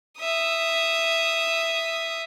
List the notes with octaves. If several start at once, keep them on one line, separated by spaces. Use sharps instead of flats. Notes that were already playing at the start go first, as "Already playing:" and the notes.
E5 D#6